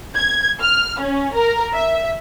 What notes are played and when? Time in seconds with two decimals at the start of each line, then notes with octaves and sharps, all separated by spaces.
0.15 G#6
0.62 F6
1.00 C#4
1.34 A#4
1.74 E5